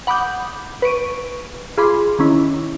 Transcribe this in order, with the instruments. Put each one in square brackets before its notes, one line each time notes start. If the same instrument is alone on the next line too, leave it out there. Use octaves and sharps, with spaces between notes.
[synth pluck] F#5 B5 D6 D#6 G6
B4 C#6 D7 D#7
F4 G#4 B5 C6 D6
D#3 C#4 E4